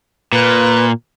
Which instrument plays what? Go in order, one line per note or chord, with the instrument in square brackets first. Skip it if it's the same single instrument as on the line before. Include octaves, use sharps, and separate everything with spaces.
[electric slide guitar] A#2 [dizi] B4